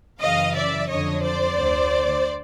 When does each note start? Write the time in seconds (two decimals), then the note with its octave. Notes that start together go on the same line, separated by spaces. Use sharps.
0.21 F#2 C#3 E3 D#5 F5
0.55 D5 E5
0.88 F2 D3 C#5 D#5
1.22 C5 D5
1.56 D2 D3